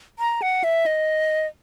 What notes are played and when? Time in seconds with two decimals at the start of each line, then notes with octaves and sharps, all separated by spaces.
0.19 A#5
0.42 F#5
0.64 E5
0.86 D#5